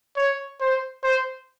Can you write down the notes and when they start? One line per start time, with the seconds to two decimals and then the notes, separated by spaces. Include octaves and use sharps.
0.17 C#5
0.61 C5
1.04 C5